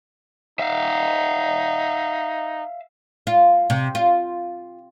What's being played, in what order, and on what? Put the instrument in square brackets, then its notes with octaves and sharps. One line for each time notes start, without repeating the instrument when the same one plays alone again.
[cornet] D#4 [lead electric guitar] E5 F5
[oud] F4
C3
F4